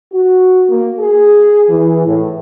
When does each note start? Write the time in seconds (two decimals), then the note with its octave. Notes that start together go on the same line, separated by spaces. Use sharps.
0.12 F#4
0.69 A#3
1.00 G#4
1.70 E3
2.06 A2